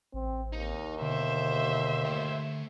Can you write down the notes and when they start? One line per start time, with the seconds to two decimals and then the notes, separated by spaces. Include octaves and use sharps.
0.14 A1 C4
0.53 D#2 D#4
1.01 B2 D3 C5 E5
2.05 A3 G5